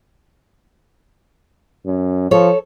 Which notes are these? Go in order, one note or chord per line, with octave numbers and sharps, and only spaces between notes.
F#2
F3 A4 C#5